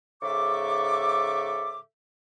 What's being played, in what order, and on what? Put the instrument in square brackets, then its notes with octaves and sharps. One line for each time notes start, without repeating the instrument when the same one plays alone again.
[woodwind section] G#2 C#3 A4 E5 C#6 D6